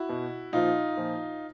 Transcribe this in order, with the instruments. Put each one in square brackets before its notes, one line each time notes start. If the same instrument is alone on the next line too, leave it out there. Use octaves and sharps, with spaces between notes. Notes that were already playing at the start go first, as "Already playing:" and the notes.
Already playing: [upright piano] E4 F#4
B2
A#2 F3 D#4 F4
A#2 F3